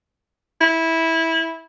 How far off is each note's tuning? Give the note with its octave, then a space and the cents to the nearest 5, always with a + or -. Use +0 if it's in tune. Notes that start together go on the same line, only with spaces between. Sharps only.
E4 -15